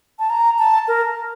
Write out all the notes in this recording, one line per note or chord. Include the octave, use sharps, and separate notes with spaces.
A5
A#5
A5
A#4